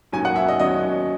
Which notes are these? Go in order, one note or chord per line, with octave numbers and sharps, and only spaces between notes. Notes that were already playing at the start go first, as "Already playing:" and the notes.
D#2 D#3 F#3 C#4 G#5
F#5
E5
D#5
D#2 D#3 F#3 C#4 D#5